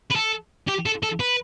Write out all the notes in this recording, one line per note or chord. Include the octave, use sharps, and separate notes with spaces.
B4
A4
G4
A4
A4
B4